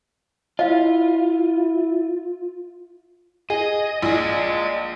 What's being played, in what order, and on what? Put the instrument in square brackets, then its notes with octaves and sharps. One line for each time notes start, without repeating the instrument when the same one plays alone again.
[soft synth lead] E4 [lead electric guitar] F4 [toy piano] D#5 F5
[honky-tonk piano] G#4 [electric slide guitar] D#5
[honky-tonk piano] A#1 [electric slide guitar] D#5 G#5